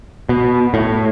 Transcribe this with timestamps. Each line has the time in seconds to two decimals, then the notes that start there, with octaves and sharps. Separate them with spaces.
0.29 B2
0.74 A2